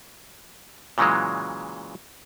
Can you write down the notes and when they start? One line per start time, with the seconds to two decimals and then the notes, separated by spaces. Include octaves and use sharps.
0.98 A#2 C#3 E3 F#3 G#3